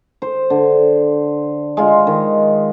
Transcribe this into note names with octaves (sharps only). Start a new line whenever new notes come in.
C5
D3
G#3 F4
D#3